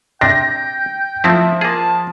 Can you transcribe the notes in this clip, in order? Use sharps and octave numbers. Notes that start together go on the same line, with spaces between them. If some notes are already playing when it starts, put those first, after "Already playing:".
C3 D4 G5 A#6
F3 A3 C4 E4 E5
A#3 G#4 A5